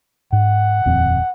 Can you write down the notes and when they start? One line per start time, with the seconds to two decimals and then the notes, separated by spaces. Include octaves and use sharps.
0.33 G#2 F#5
0.86 D#1 F2 C4